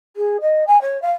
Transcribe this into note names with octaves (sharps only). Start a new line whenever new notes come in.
G#4
D#5
G#5
C#5
F5